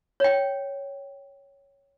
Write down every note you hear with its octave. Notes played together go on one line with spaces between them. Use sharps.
C#5 G5